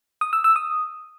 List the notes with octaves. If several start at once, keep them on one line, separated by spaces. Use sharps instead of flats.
D#6
E6
E6
D#6